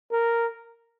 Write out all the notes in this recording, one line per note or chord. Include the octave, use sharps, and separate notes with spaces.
A#4